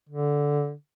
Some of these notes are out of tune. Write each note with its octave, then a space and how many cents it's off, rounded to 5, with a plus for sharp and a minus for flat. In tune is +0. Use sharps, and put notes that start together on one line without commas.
D3 -10